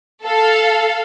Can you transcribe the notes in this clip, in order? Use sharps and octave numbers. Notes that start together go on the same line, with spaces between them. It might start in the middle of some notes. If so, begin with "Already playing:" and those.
A4 F5